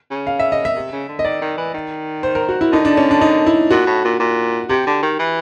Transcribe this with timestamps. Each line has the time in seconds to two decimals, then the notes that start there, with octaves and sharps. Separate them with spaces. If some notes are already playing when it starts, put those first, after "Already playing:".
0.11 C#3
0.27 F5
0.40 E5
0.52 D#5
0.65 E5
0.75 C3
0.92 C#3
1.09 D3
1.19 D#5
1.24 D#3 D5
1.42 D#3
1.58 E3
1.74 D#3
2.23 C5
2.35 A#4
2.49 F#4
2.61 E4
2.72 D3 D#4
2.85 D4
2.97 C#4
3.11 D4
3.21 D#4
3.46 E4
3.71 A#2 F#4
3.87 A2
4.05 A#2
4.20 A#2
4.69 C3 G4
4.87 D3
5.03 D#3
5.19 E3